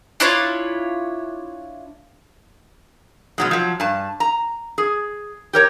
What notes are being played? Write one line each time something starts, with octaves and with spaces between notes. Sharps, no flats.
D4 E4 F4 C#5
B2 F#3 G#3
F3 F#3
G2 A5
A#5
G#4
G4 A#4 C#5